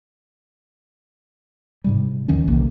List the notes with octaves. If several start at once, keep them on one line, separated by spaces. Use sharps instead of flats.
G#2 C3 G3
D#2 D#3 E3 C#4
B1 C3 A#3